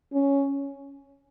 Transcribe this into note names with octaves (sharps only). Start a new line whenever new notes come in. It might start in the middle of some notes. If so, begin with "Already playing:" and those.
C#4